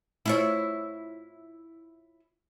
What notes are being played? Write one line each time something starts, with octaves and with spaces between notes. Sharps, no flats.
E4 F4 C#5